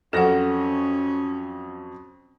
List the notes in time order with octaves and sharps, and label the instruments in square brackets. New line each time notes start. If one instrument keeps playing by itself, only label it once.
[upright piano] F2 F#3 A#6 [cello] C#4 [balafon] A4 F#5